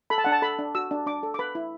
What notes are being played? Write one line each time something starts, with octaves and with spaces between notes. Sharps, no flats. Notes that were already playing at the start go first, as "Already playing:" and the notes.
A4 B5
A5
D4 F#5
A5
A4 B5
D4
F#4 E6
D4
D4 D6
A4
D6
B4 B5
E4